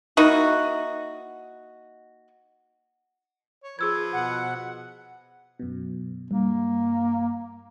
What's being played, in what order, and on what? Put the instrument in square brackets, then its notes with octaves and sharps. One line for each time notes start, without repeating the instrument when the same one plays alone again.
[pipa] A#3 D#4 E4 F#4
[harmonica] C#5
[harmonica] F3 B4 [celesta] G#4 E6 G#6
[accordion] B2 F#5
[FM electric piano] F#2 B2
[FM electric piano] G2 [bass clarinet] A#3